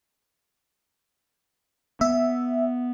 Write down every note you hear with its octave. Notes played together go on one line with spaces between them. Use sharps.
B3 E5